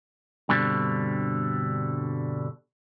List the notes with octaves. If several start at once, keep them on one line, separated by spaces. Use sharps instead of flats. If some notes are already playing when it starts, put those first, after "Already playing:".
G2 B2 D3 G3 C4